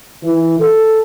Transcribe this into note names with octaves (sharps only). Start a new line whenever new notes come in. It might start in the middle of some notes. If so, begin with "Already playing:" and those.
E3
A4